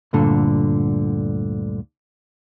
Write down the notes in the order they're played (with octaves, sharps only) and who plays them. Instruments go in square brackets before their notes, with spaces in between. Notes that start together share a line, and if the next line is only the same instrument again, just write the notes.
[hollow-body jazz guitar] D2 G2 A#2 D3 A4